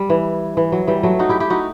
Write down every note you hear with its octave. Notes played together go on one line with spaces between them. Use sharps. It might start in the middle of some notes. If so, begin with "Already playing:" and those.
Already playing: G3
E3
E3
F#3
E3 G3
F#3 A3
D#4 F#4
E4 G4
E4 G4
D#4 F#4